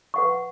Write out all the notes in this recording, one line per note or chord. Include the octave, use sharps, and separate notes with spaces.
B4 F#5 C#6